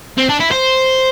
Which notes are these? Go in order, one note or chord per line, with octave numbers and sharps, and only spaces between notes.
C4
D4
E4
C5